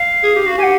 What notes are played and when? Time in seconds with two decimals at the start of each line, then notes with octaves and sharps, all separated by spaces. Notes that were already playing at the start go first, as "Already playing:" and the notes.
Already playing: F5
0.23 G#4
0.36 G4
0.46 F#4
0.58 G4 F#5 G#5